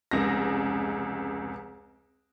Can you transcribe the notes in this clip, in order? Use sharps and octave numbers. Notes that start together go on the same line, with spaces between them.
F1 C#2 A#6